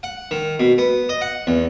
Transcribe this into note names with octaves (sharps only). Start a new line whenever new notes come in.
F#5
D#3
B2
B3
D#5
F#5
E2